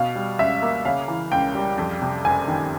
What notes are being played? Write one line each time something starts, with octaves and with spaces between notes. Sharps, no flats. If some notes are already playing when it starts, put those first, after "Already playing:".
Already playing: B2 F5
G3
C#2 E5
A#3
C#3 F5
E3
C#2 G5
G3
F2
C3
F#1 G#5
D#3